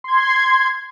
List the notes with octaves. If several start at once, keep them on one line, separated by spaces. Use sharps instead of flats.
C6 G#6